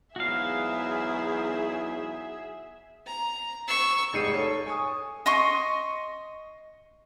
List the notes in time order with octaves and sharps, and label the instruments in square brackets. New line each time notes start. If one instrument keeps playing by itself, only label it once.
[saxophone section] E2 G#2 F#3 [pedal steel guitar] F#4 F5 [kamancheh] G#4 E5
[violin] A#5
C#6 E6
[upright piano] F1 G#2 D#4 C7 C#7 D#7
A4 C#5
G#5 C#6 D#6
[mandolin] D#5 C6 C#6